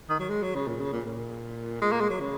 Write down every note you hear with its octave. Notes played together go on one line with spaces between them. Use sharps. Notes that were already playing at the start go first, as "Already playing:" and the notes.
D#3
F#3
G#3
F#3
C#3
A#2
C#3
A#2
A#2
G#3
A#3
G#3
F#3
C#3